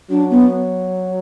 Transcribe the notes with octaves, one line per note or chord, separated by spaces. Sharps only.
F#3 D4
B3